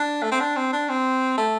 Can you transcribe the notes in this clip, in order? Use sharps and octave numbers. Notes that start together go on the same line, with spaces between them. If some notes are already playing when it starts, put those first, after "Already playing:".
Already playing: D4
A3
C4
D4
C4
D4
C4
A3